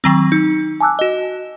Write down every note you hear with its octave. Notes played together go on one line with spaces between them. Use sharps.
D#3 F#3 C4
D#4
G#5 A5 D6 E6 F#6
F#4 D#5